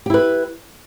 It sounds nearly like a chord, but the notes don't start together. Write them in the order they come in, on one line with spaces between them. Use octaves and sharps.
G4 E4 B4